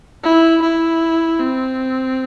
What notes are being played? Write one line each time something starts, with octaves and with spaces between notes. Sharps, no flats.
E4
E4
C4